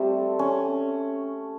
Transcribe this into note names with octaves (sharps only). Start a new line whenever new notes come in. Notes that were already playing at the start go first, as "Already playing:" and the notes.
Already playing: G3 A3 C4
C#4